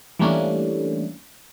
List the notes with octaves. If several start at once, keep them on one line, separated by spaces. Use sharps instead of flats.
E3 G3 A3 A#3 C#4 D4